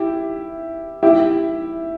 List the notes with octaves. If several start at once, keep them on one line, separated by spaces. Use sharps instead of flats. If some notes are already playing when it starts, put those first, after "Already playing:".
Already playing: E4 G4
E4 G4